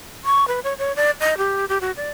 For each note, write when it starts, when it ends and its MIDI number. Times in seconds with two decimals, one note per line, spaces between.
0.25 0.47 85
0.48 0.60 71
0.64 0.73 73
0.78 0.95 73
0.96 1.11 74
1.21 1.38 75
1.38 1.65 67
1.69 1.78 67
1.81 1.92 66
1.97 2.10 74